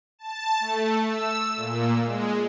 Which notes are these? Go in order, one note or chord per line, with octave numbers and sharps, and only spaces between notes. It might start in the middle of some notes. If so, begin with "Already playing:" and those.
A5
A3
E6
A#2
G#3